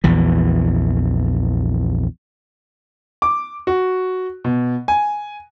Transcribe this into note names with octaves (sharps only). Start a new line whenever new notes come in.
A#1 E2 E3
D6
F#4
B2
G#5